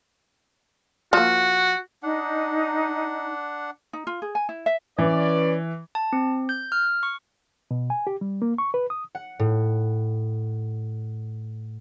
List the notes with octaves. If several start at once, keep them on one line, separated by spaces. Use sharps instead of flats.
F3 A#3 F#4
D4 D#4 F#5
D#4
F4
G#4
G#5
E4
E5
E3 C#4 B4 D5
A5
C4
G6
F6
C#6
B2
G#5
G4
G3
A#3
C#6
B4
D#6
F#5
A2